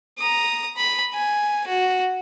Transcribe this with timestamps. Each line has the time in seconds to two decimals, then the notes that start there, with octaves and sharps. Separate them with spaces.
0.19 A#5 D#6
0.77 B5
1.14 G#5
1.67 F#4